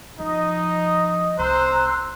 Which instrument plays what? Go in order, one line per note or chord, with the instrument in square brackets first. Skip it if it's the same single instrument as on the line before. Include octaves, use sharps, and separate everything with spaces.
[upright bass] F3 [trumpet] D#4 [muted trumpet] D#5
[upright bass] C2 [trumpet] C5 [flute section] A#5 E6 F#6 [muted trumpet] C6